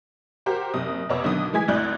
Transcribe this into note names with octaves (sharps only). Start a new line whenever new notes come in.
F#4 G4 A#4 C5
F#1 C3 D#6
F2 C3 B3 C#5 D6 E6
B1 D3 D#3 D#6
E3 G#3 G#5 G#6 B6
G#1 D2 E4 D5 F#6 G6